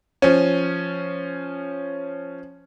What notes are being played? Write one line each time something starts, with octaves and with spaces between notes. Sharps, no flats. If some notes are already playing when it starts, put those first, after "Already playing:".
F3 C#4